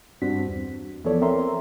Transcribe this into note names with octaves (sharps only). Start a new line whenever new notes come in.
G2 G3 C4 D4 F#4 B6
E2
E3 F3 B3 A4 C#5 D5
C4 A#4 E5 A#5 C6